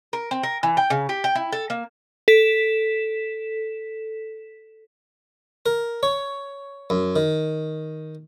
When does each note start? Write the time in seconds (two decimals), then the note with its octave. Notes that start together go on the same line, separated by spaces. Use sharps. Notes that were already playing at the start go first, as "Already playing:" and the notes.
0.13 A#4
0.31 C4
0.43 A#4
0.63 E3
0.77 G5
0.90 C#3
1.09 G4
1.24 G5
1.35 E4
1.52 A4
1.70 A#3
2.28 A4 B6 E7
5.66 A#4
6.03 C#5
6.90 F#2
7.16 D#3